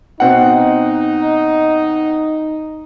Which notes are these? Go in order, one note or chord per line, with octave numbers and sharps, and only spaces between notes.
B2 C4 D#4 F#5